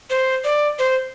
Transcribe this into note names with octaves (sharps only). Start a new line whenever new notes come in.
C5
D5
C5